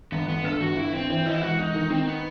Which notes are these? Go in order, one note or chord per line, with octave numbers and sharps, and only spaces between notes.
G1 B3
G1 B3
G2 A4
G1 F#4
G2 E4
G2 C4
E3 C4
E3 D#4
E4
E1 F#4
E1 D#4
D#3 D#4
D#3 C4
B3